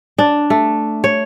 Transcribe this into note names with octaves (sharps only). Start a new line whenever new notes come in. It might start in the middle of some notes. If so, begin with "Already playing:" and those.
D4
A3
C#5